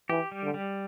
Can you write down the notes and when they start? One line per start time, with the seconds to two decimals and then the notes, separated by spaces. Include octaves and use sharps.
0.09 E3 G4
0.32 G3
0.43 D3
0.54 G3